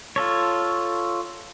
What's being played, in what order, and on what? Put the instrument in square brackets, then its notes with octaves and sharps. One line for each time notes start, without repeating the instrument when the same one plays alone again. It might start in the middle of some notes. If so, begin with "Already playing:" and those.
[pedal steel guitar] F4 A4 C#5